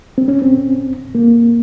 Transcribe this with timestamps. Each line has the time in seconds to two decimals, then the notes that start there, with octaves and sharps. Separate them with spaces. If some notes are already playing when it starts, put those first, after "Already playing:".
0.18 C4
0.28 C#4
0.42 C4
1.15 A#3